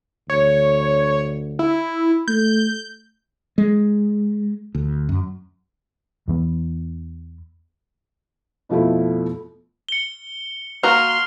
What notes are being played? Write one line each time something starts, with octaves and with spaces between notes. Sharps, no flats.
D2 C#5
E4
A3 G6
G#3
D2
F#2
E2 E3 B3
F2 B2 F3 A3 E4
C#7 G7
A#3 F#4 A#5 C6 F6 F7